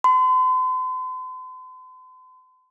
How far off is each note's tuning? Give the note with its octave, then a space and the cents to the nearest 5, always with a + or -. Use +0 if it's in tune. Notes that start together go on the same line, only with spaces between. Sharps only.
C6 -45